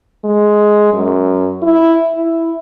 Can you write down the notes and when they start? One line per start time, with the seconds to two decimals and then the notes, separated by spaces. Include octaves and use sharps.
0.24 G#3
0.93 F#2
1.62 E4
2.15 E4